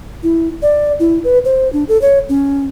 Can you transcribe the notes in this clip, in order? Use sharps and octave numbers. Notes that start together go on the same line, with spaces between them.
E4
D5
E4
B4
C5
D4
A4
C#5
C#4